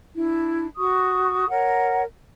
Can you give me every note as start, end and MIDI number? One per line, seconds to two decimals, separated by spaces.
0.15 0.66 62
0.15 0.66 64
0.76 1.48 66
0.76 1.48 85
0.76 1.48 87
1.48 2.02 70
1.48 2.02 73
1.48 2.02 78